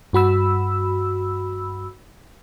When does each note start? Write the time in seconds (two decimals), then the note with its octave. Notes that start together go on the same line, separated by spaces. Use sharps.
0.13 G2 F#4 B5 E6